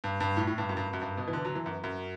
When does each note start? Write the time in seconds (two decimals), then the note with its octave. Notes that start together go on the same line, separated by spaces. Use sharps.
0.04 G2
0.20 G2
0.37 A2
0.47 A2
0.58 G2
0.69 F#2
0.77 G2
0.93 F#2
1.01 G2
1.17 B2
1.28 E3
1.33 D3
1.45 F#3
1.55 E3
1.66 F#2
1.84 F#2